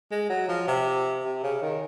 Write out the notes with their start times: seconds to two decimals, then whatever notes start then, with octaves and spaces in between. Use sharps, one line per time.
0.12 G#3
0.29 F#3
0.48 F3
0.67 C3
1.24 C3
1.43 C#3
1.62 D#3